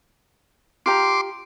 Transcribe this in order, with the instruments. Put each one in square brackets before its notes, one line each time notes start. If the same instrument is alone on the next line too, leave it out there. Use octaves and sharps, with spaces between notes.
[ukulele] F4 G4 A#5 [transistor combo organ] C6 D6